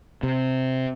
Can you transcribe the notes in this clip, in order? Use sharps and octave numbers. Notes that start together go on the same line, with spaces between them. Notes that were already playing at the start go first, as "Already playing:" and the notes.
C3